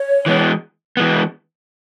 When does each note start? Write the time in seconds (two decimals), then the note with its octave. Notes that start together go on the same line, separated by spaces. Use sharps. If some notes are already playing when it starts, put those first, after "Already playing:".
Already playing: C#5
0.26 E3 G#3 B3
0.97 E3 G#3 B3